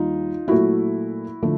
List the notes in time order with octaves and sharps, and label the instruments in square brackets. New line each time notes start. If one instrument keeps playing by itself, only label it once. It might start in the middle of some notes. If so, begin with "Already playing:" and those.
Already playing: [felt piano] D#2 D#3 G3 D#4 F4
A#2 F#3 A3 E4 F#4
D3 F3 A3